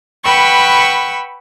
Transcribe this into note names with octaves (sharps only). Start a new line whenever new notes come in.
B4 F#5 G5 B5 C#6 E6